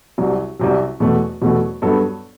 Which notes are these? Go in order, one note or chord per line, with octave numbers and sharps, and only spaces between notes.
C2 C3 F#3
C2 C3 F#3
E2 B2 F#3 A3
E2 B2 F#3 A3
G2 F#3 B3 F#4 A4